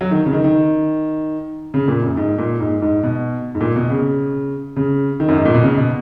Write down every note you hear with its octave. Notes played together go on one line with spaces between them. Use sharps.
F#3
D#3
C#3
D#3
D#3
C#3
A#2
F#2
G#2
A#2
G#2
G#2
B2
G#2
A#2
B2
C#3
C#3
D#3
F#2
G#2
A#2
B2
C#3
B2